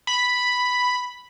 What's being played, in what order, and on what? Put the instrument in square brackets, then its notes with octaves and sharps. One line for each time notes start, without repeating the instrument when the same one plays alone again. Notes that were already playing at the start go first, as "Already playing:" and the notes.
[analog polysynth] B5